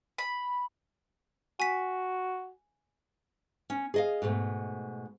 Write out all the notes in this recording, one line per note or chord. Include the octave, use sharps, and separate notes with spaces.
B5
F#4 G#5 B6
C#4
G#4 D#5 F5
G#2 B2 A3